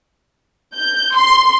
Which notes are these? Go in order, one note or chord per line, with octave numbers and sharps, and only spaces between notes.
G6
C6